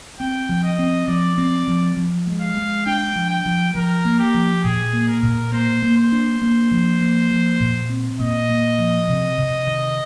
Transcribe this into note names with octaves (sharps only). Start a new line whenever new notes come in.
C4 G5
F3
D#5
C4
F3 D5
C4
F3
F3
G#3
F5
G#3
D4 G5
F3
G5
F3
F3 A#4
A#3
G4
F3
A#2 G#4
A#3
A#4
A#2
A#3 C5
A#3
C5
D4
A#3
F3
A#3
F3
A#2
C4
A#2 D#5
A#2
F3
C3
C3
D#3